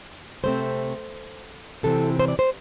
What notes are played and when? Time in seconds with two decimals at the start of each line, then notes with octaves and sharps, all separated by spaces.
0.43 C3 A3 C4 C5
1.83 C3 E3 C4 A4
2.19 C5
2.28 D5
2.39 C5